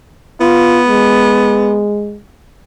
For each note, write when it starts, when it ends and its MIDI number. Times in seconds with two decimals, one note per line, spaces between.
0.41 1.85 59
0.41 0.82 65
0.88 2.18 56